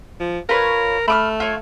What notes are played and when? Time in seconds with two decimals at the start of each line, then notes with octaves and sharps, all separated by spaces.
0.20 F3
0.49 F4 A#4 B4 C#5
1.08 A3 B5 D6 F6
1.40 F4 C#5